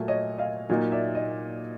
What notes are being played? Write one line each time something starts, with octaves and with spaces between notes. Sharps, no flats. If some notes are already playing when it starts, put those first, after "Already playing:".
Already playing: A#2 F#3 A3
C#5 D#5
D#5 F5
A#2 F#3 A#3 D#4
D5 E5
D#5